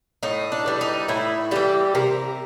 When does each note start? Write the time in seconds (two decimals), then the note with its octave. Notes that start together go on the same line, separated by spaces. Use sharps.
0.23 A2 D#4
0.52 D4
0.66 E3 G3
0.81 D#4
1.08 A2 E4
1.51 E3 G3 G4
1.95 C3 A#4